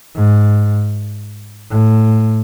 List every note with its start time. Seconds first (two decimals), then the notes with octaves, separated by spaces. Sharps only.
0.16 G#2
1.71 A2